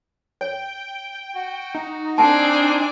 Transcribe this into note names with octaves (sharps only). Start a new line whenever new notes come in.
C#5 G5
F#4
D#4
C4 D4 G#5 A5 D6